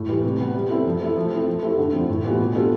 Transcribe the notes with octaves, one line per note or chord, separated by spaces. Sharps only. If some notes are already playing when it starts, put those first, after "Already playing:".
Already playing: A2
E3 G3
C3
G3 B3
G3
C4 E4 A4
F3
A3 E4
F3
C4 E4 A4
F3
A3 E4 G4
D3
F3 C4
A2
E3 G3 B3 F4
B2
G3 D4 F4 A4